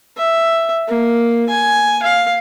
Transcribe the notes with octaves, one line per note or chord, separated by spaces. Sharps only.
E5
A#3
G#5
F5